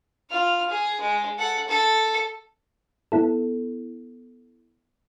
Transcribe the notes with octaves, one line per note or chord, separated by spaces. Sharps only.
F4 F6
G#4
G#3
A4 F#5
A4
B3 E4 A4